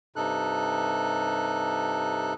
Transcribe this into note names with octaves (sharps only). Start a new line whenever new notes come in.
G2 C3 D#4 A4 F#6